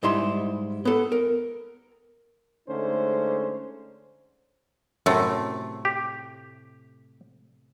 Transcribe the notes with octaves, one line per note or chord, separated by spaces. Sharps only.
G#2 G3 E4 C6
B3 A4
A#4
D3 G#3 A3 C#4 D#4 C5
F#2 A2 C3 A3
G4